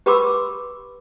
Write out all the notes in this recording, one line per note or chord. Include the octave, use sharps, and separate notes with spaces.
G4 B4 B5 C6 D6 E6